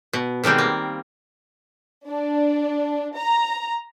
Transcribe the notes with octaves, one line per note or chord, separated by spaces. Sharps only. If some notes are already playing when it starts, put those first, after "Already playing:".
B2
B2 D#3 G3 G#3 C4
A#3
D4
A#5